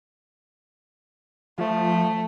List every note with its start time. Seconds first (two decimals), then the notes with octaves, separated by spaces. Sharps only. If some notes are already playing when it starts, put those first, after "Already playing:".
1.58 F3 A3